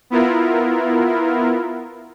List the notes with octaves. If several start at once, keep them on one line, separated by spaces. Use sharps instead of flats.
B3 E4 F4 A#4